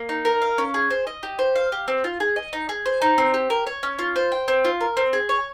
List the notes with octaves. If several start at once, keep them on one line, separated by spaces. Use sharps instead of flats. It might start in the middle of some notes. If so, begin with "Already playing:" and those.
Already playing: A#3
D#4
A#4
F5
C#4
G#4
C5
D#5
G4
C5
F5
G4
C4
F4
G#4
D#5
D#4
G#4
C5
D#4
C4
G4
A#4
C#5
C#4
F4
C5
G5
C4
F4
A#4
C4
G#4
C#5